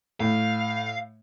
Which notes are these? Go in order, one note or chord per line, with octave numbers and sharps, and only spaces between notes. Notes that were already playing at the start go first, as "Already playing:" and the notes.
A2 F5